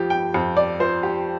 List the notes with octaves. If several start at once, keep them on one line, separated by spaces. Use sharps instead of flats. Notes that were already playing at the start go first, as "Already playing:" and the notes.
Already playing: F2 F3 G4
G5
F2
D5
F3 C5
G4